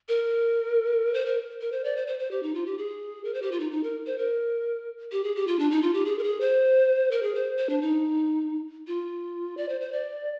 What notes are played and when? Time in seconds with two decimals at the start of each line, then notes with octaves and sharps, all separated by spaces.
0.09 A#4
1.14 C5
1.26 A#4
1.61 A#4
1.72 C5
1.84 D5
1.96 C5
2.07 C5
2.19 C5
2.31 G4
2.43 D#4
2.55 F4
2.66 G4
2.78 G#4
3.25 A#4
3.34 C5
3.42 G4
3.52 F4
3.60 D#4
3.72 D#4
3.83 A#4
4.06 C5
4.18 A#4
5.12 G4
5.24 G#4
5.36 G4
5.47 F4
5.59 D4
5.71 D#4
5.82 F4
5.94 G4
6.05 G#4
6.18 A#4
6.23 G#4
6.40 C5
7.11 A#4
7.23 G#4
7.35 C5
7.58 C5
7.69 D4
7.81 D#4
8.87 F4
9.57 D5
9.69 C5
9.81 C5
9.92 D5